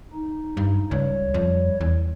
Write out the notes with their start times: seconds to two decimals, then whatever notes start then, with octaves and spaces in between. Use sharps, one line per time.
0.13 D#4
0.57 G2
0.91 C#2 G3 C#5
1.34 F2
1.81 E2